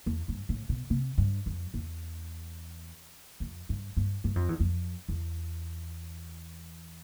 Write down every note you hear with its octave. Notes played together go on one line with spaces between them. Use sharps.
E2
G2
A2
B2
C3
G2
F2
E2
F2
G2
G2
G2
F2
E2
F2
E2